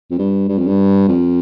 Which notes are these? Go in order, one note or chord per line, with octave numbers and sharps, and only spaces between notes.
F2
G2
G2
F2
G2
F2